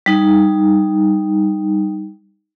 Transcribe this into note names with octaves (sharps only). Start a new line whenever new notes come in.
G3 D#4